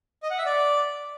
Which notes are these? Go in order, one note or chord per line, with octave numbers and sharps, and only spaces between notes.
D#5
F#5
E5
D5